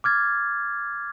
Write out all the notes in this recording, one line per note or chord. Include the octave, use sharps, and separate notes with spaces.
D6 F6 G#6 A6